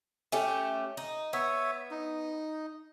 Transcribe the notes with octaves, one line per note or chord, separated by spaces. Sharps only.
A3 C#4 G4
D#4
B3 C#5 E5
D#4